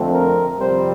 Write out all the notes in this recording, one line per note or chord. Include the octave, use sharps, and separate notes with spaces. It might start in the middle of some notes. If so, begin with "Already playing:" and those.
Already playing: F2 D3 A3 C4
A#4
F2 C3 G3 C4 C5